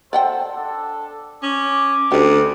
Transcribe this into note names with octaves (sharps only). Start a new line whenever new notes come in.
A3 A4 C5 D5 F#5 G5
D4 A4
C#4 D6
D2 C#4 G4